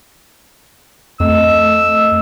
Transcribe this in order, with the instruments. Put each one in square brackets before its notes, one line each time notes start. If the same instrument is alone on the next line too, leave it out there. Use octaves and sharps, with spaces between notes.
[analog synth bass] F2 [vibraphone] A3 D#5 [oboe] E6